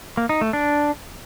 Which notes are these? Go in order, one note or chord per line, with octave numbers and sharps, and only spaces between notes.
A#3
D#4
A3
D4